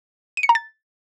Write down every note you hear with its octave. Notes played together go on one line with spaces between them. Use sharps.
D#7
C#7
A#5
A6